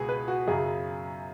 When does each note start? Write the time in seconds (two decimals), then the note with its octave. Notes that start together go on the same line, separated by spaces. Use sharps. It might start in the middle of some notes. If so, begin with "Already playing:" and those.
Already playing: C#2 B2 B3 G#4
0.09 B4
0.28 F#4
0.47 F#2 C#3 F#3 G#4